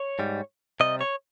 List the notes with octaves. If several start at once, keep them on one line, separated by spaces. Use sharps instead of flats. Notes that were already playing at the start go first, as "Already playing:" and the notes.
Already playing: C#5
G#2 G3
C3 G3 D#5
C#5